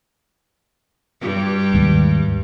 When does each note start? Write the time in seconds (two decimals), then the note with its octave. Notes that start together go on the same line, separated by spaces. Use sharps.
1.21 G2 G3
1.74 D#2 G#2